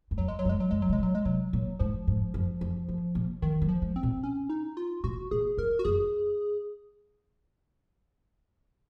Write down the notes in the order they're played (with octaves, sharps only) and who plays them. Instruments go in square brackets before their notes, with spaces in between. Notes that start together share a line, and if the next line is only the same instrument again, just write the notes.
[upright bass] F#2
[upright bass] F2 [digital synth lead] F#3
[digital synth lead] G#3
F#3
[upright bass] F#2
[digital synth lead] G#3
F#3
[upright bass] F#2 [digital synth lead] G#3
[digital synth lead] F#3
[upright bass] C3 [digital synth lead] G#3
[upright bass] A#2
[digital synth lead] F#3
G#3
[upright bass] C3 [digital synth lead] F#3
[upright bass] A#2
[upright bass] G#2 [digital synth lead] F3
[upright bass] G#2
F#2
F2
F#2
A#2
[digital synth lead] D#3 [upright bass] F3
[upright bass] F#3
[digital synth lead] F3
[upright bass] G#3
[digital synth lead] C4
[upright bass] A#2
[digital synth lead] C#4
D#4
F4
[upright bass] A#2 [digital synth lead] F#4
[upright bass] A#2 [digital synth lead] G#4
[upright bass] F#2 [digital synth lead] A#4
[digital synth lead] F#4
[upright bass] F#2 [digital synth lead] G#4